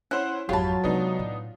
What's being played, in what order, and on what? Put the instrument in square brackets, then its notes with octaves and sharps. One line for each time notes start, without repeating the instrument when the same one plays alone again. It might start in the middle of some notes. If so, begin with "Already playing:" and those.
[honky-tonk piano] C#4 E4 C5 [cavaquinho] F#5
[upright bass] G#1 F2 [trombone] F#3 [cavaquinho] F4 A5 [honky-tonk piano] G4 C#5 B5
[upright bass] C3 G#3 [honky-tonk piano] B3 D4 D#4
[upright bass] A2